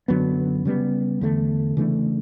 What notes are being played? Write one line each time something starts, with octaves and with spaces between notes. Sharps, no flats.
F#2 D3 F#3 B3
C#3 G3 B3
E2 D3 A3
C#3 E3 A3 D4